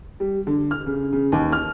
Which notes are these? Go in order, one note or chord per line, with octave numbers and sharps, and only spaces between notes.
G3
D3
F6
C#3
C#3
D#2
F6